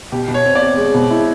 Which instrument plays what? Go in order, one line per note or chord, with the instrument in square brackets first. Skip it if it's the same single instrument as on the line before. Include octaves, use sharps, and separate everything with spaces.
[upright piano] B2 [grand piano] G4
[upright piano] B2
[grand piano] C#5
[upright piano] C4
[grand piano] D5
[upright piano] C4
G#3
B2
E4